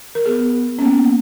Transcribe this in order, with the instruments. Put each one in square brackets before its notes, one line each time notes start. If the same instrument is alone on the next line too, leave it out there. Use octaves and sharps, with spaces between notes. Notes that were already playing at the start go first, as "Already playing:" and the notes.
[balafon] A#4
[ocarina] B3 [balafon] G#4
[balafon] C#4
[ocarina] A#3 [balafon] B3